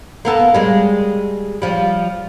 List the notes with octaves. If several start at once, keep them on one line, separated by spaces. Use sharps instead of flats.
A#3 B3 A4
G3 G#3
F3 G3